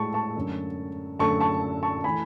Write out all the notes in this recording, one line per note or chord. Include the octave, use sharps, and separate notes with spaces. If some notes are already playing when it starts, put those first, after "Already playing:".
Already playing: A2 G#3 A5 C#6
A5 C#6
F#2 D3 A3
F#2 D3 A3 A5 C#6
A5 C#6
A5 C#6
E3 A3 G#5 B5